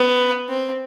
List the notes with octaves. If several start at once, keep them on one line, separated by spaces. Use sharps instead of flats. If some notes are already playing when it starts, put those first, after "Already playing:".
Already playing: B3
C4